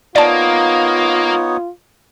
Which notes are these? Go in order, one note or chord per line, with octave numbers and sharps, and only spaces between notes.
A#3 B3 D#4 F4 C#5 D5 A5